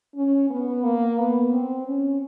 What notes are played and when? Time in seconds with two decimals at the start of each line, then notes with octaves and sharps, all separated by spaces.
0.15 C#4
0.50 B3
0.83 A#3
1.18 B3
1.52 C4
1.87 C#4